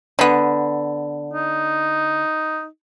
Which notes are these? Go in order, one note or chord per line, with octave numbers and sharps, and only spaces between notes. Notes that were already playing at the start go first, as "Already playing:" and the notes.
D3 B3
D#4